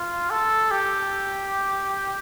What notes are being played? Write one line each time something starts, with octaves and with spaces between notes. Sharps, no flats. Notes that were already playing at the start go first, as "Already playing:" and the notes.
Already playing: F4
A4
G4